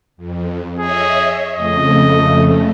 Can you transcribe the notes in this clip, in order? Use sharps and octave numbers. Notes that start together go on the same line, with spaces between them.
F2
G#4 C#5 D#5 E5
F2 C#3 A3 D#5